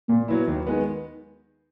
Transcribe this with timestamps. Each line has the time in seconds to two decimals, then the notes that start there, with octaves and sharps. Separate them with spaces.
0.09 A#2 A#3
0.28 F#3 B3 E4
0.47 D#2
0.67 D#3 G#3 B3